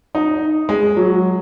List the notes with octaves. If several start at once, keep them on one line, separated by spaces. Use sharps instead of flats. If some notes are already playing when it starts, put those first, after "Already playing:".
D#4
G#3
F#3